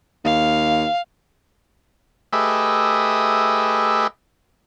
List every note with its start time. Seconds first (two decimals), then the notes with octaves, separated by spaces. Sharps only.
0.25 D#2 F5
2.33 A3 G4 G#4 B4 D#5 E5